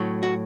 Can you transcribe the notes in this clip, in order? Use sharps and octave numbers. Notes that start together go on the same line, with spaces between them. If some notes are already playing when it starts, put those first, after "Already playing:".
Already playing: A2 F#3
F#4